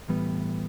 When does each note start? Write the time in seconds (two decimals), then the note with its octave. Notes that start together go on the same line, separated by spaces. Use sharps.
0.08 A2 E3 G3 B3